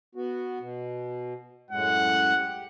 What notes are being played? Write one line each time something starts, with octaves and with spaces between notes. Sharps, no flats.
B3 F#4
B2
F#2 A2 G#3 F#5
G4